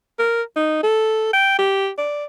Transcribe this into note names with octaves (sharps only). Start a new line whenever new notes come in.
A#4
D#4
A4
G5
G4
D5